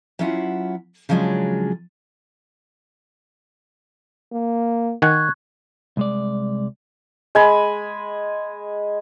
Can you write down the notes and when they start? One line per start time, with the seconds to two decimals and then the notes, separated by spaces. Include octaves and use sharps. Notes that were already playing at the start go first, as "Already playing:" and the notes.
0.19 F#3 C#4 E4 F4 F#5
1.09 C#3 F3 F#3 G#3 C#4 D4
4.33 A#3
5.02 D#3 F#5 G#5 C#6 F#6 G#6
5.97 C2 G#3 D5
7.35 G#3 G#5 B5